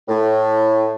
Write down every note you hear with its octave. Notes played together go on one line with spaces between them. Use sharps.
A2